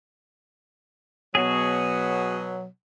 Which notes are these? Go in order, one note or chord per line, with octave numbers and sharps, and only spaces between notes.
B2 F#3 F#4 G#4